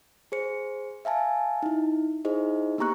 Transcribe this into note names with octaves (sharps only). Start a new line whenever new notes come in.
G#4 C5 C#7
E5 F5 G#5 A5
D#4 E4
D#4 E4 G#4 C5 D#5
A#3 B3 G4 A#5 C#6 F#6